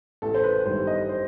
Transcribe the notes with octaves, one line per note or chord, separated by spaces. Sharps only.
A1 A4
C5
B4
G2 D#3 G3 C5
D#5
C5